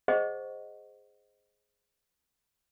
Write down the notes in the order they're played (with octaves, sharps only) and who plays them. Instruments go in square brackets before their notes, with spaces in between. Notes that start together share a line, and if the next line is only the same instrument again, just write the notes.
[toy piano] G#4 C5 D#5 F#5 C#6